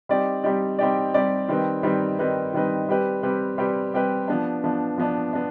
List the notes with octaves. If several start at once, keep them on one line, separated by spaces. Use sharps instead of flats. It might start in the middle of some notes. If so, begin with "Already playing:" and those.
G3 C4 D#4 G4 D5
G3 C4 D#4 G4 D5
G3 C4 D#4 G4 D5
G3 C4 D#4 G4 D5
D#3 G3 C4 D#4 B4
D#3 G3 C4 D#4 B4
D#3 G3 C4 D#4 B4
D#3 G3 C4 D#4 B4
G3 C4 G4 B4
G3 C4 G4 B4
G3 C4 G4 B4
G3 C4 G4 B4
F3 B3 D4
F3 B3 D4
F3 B3 D4
B3 D4